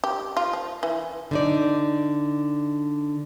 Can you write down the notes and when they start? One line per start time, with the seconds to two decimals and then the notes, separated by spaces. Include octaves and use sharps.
0.04 G4
0.37 F4
0.53 F3
0.83 E3
1.31 D3 D#4 D5